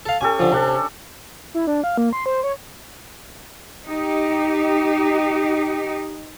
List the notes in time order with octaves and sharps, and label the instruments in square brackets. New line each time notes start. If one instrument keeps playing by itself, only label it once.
[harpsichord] A4 F5
[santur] C#4 G4 A4 [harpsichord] G#5
[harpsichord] D3 F3
[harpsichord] C3 [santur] C#4 D4 A4
[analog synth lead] E4
D4
F5
A#3
C6
C5
C#5
[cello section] D#4 G4